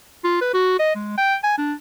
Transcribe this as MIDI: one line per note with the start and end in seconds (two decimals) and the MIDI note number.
0.25 0.37 65
0.41 0.49 71
0.54 0.75 66
0.79 0.95 75
0.96 1.14 56
1.18 1.36 79
1.44 1.55 80
1.58 1.73 62